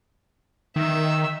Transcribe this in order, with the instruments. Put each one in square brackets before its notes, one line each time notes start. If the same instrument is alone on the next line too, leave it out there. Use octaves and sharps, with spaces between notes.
[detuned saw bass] D#3 [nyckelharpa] E5